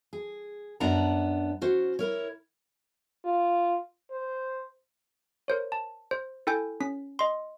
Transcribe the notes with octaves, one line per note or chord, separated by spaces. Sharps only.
G#4
F#2 B3 D4 D5 F#5 A#5
C#4 F#4 C5
E4 A#4 C#5
F4
C5
A#4 C5 C#5
A5
C5
E4 A4 G5 G#5 G6
C#4 B6
D#5 C6